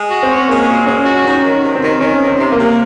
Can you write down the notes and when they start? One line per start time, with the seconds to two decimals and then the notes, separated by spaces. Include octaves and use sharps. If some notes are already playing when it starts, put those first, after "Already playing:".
Already playing: G#3
0.10 F#4
0.23 C4
0.29 C#4
0.49 G#3 A#3
0.67 A#2
0.86 G#3 C#4
1.05 F#4
1.24 D#3 C#4
1.44 D#3
1.62 C3
1.75 C4
1.82 D#3
2.01 D#3 C#4
2.21 C3
2.27 C4
2.39 C3
2.52 A#3
2.59 C3